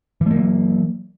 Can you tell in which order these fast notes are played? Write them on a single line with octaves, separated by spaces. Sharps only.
E3 A3 A#3 F#3